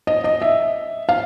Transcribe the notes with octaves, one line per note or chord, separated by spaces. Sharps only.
D#5
D#5
E5
F5